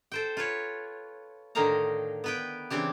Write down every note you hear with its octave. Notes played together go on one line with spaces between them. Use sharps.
A4 C5 G5
F4 B4 C#5
A2 D3 D#3 D#4 F5 A#5
B3 B4 G5
C#3 E3 C4 D4 G4